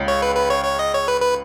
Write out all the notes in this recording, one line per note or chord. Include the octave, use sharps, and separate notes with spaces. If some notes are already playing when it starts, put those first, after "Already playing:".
Already playing: C#2 C#3 C#4
C#5
B4
B4
C#5
C#5
D#5
C#5
B4
B4